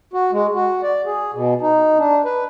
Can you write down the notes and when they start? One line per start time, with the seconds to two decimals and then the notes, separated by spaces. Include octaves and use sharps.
0.13 F#4
0.32 G#3
0.54 F#4
0.83 D5
1.06 G#4
1.34 B2
1.62 D#4
1.99 D4
2.25 B4